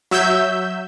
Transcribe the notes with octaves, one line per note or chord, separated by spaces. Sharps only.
F#3 E5 E6 G6